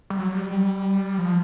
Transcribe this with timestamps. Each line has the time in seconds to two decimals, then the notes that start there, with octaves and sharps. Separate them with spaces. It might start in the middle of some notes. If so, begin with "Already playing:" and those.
0.10 G3
0.18 F#3
0.34 G3
0.51 G3
1.18 F3